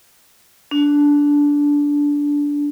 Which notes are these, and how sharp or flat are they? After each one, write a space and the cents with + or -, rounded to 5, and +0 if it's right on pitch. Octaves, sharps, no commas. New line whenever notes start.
D4 -15